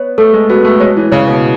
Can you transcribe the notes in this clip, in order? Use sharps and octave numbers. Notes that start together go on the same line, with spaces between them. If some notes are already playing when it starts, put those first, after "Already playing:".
Already playing: B3 C#5
A3 A4
G#3
B3 F#4
A3
G#3 C#5
E3
C#3 C#5
B2